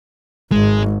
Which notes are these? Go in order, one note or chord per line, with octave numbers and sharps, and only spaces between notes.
G#1 G#3